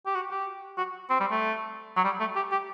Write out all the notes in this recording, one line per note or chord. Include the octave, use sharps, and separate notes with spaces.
G4
F#4
G4
F#4
C4
G3
A3
F#3
G3
A3
G4
G4